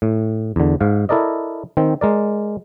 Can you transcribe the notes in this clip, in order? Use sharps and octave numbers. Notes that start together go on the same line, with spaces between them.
A2
E2 D3
G#2 F5
E4 A4 A#4 D5 D#5
D#3 C4
G#3 A#4 D5